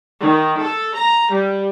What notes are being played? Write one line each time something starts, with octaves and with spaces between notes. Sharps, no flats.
D#3
A4
A#5
G3